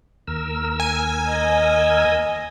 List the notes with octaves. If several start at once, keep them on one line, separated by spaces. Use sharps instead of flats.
D#2 A#4 E6
G#5
D#5